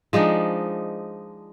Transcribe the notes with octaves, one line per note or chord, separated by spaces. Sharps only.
F3 G#3 D4 D#4